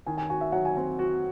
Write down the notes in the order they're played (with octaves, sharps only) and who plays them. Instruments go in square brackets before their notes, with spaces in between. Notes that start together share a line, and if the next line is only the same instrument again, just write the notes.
[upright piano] D#3 [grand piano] G#5
[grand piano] G#5
[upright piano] F#4 [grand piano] G#5
[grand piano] E5
[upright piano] F#3 [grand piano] F#5
[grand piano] G#5
[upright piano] C4 [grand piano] G#5
[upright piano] F#4